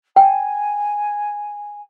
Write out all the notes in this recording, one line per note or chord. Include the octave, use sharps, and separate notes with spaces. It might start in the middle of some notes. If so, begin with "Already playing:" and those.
G5 G#5